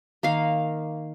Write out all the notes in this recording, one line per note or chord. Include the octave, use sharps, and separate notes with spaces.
D#3 A#3 F5